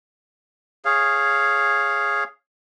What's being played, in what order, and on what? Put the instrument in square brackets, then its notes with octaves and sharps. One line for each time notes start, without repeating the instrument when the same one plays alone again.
[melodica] G#4 C#5 F5